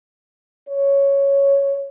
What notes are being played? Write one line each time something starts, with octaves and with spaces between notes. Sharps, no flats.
C#5